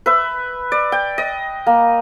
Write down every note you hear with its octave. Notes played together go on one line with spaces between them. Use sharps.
B4 E5
D5
G5
D#5
A#3